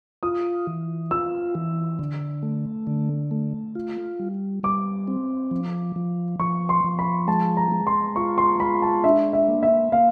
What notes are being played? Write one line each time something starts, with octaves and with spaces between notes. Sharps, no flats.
F4 D#6
E3
F4 E6
E3
D3
A3
D3
A3
F4
G3
G3 D6
C4
F3
F3
F3 C#6
C6
F3
B5
G#3 A5
A#5
G#3
C6
F4 C#6
C6
G#3 B5
A5
D4 E5
E5
A#3
E5
A#3 F5